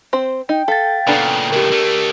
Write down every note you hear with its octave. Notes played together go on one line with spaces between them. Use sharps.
C4 C5
D#4 G5
A4 F5 A6
A#2 C#3 B3 D4 A4
C#2 A2 G4 A#4
D3 A3